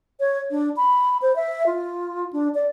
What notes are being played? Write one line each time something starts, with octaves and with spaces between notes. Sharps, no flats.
C#5
D4
B5
C5
E5
F4
D4
D5